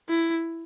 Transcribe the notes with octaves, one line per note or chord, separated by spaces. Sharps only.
E4